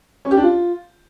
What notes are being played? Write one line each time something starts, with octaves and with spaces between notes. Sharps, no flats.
C#4
G4
D4
F4